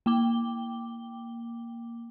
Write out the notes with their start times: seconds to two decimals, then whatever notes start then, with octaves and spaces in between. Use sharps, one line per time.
0.06 A#3 G5 D6 G7